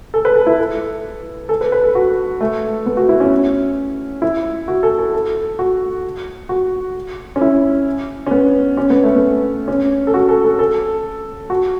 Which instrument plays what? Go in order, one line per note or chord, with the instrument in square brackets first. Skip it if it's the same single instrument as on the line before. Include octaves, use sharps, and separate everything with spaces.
[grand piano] A4
B4
A4
E4
A4
A4
B4
B4
A4
F#4
A3
B3
F#4
E4
C#4
E4
F#4
A4
A4
A4
F#4
F#4
C#4
E4
C#4
B3
C#4
B3
A3
B3
C#4
A4
F#4
A4
A4
A4
F#4